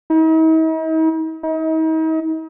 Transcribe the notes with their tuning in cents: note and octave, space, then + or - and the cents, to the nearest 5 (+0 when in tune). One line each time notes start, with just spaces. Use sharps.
D#4 +45
D#4 +40